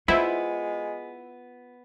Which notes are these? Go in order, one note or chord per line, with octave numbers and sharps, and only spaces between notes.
G#3 B3 E4 F4 C5